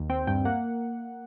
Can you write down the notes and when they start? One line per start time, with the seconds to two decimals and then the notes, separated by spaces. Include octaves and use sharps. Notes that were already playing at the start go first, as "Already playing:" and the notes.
Already playing: D#2
0.10 C4 G5
0.27 G2 G5
0.45 A#3 F#5